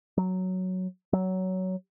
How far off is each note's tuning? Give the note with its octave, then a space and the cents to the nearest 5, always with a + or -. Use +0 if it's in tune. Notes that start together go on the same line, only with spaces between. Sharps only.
F#3 +0
F#3 +15